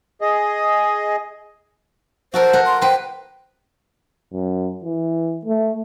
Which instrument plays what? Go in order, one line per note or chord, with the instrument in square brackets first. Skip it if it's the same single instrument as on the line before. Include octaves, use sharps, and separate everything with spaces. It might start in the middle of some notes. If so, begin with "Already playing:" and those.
[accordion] G#4 D#5
[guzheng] F#4 A4 A#4 [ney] C5
[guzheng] A#4 F#5
[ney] C6
[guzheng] B4 C5 [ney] G5
[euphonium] F#2
E3
A3